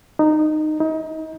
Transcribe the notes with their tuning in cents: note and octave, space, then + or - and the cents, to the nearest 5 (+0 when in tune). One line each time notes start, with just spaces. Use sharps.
D#4 -15
D#4 +30